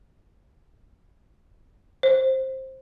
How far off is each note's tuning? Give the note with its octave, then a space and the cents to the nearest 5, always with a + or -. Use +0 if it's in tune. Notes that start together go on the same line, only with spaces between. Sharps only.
C5 +15